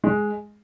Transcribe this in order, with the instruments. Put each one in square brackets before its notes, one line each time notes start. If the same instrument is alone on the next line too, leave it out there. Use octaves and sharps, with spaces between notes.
[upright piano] G#3